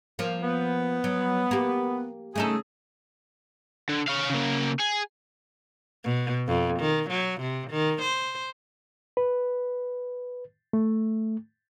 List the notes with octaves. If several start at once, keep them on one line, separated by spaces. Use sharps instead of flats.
F3 A#3 F4
B3
F#3
A#3 G4
C#3 A3 D#4 G#4 A4
D3
C#4 F5
C#3 A#3
G#4
B2
F2
D#3
F#3
C3
D#3
C5
B4
A3